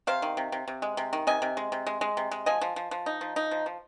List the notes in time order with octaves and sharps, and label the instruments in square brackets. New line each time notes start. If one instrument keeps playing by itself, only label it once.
[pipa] C3 C5 F5
D#3
C3
C3
C3
G#3
C3
D#3
C3 D#5 G#5
C3
G#3
C3
G#3
G#3
C3
G#3
F3 D#5 G#5
F3
F3
F3
D#4
F3
D#4
F3
F3